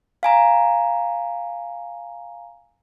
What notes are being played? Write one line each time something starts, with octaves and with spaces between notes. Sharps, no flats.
F5 G#5 A#5